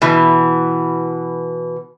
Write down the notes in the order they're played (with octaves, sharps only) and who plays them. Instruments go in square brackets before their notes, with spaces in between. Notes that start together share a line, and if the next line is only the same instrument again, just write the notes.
[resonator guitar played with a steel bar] B2 E3